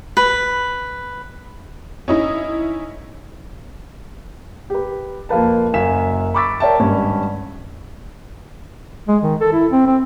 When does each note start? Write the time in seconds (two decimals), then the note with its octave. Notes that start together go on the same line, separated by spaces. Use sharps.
0.17 B4
2.08 C#4 D#4 E4
4.70 G4 B4
5.29 F2 A#3 F4 B4 A5
5.74 F#1 F#2 F5 G#5 B6 E7
6.34 B5 C#6 D6 E6 A6 B6
6.60 A#4 C#5 D5 E5 G5 A5
6.80 G#1 G2 C#4
9.08 G#3
9.23 D#3
9.41 A4
9.53 E4
9.71 C4
9.87 C4